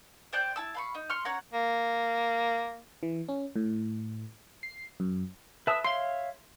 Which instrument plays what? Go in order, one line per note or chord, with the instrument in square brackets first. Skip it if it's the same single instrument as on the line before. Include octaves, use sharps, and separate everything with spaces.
[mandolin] C5 D5 G5 F#6
E4 A5 E6
F5 B5 C#6
D#4
C6 C#6 F6
C#4 C#5 F#5 A#5
[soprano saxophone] A#3
[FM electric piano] E3
C#4
A2
C7
F#2
[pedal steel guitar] B4 A5 D#6 [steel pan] E5
[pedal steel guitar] C#5 E5 F5 [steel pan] C6